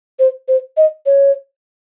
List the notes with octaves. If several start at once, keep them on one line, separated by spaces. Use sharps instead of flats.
C5
C5
D#5
C#5